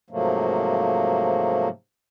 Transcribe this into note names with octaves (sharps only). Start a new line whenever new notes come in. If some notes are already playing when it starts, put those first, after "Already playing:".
G#2 C3 F3 F#3 A3 A#3